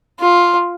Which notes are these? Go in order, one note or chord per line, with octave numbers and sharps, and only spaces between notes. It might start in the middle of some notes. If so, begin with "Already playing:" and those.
F4